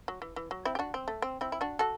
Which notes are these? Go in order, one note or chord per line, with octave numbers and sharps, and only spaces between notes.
F#3
E3
E3
F#3
C4 E4
G4
D4 F#4
C4
A3
C4
C4 E4
E4
D4 F#4
F#4 A4